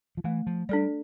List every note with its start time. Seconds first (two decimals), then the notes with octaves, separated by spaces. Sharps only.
0.17 F3
0.24 E3 A3
0.47 F3
0.69 G3 D4 A4 D5